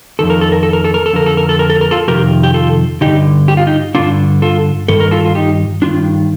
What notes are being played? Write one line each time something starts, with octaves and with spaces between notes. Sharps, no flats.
F2 D#3 A4
A#4
A4
A#4
A4
A#4
A4
A#4
A4
F2 D3 A#4
A4
A#4
A4
A#4
A4
A#4
F4 A4
F2 C3 D#3 G4 A#4
G4
F4 A4
G2 D3 D#4 G4
G4
F4
D#4 G4
G2 D3 D4 F4
F4 A4
G2 D#3 A4
A#4
F4 A4
F4
D#4 G4
G2 D#3 D4 F4